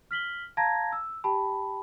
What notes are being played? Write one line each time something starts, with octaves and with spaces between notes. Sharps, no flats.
F6 B6 F#7 G7
F5 A5 A#5 G#6 A#6
E6
G4 G5 A5 B5